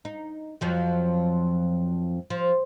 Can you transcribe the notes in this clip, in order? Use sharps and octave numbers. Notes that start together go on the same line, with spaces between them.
D#4
F2 F3 F#3
F3